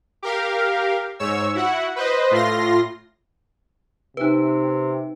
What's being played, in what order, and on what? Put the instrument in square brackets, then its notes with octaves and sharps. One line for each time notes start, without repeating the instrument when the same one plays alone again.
[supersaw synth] G4 A#4 F5
G#2 C#5 E6
E4 F#4 F#5
B4 C5 D#5
A2 F4 C6 A#6
[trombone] C3 [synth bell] D#4 B4